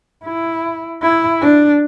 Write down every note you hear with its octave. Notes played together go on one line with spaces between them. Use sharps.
E4
E4
D4